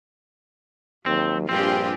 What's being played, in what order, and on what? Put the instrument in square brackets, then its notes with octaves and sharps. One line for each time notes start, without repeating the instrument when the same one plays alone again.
[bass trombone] D#2 [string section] F#3 [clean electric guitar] C4
[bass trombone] A#1 [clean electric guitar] G2 C4 [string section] F4 G4 G#4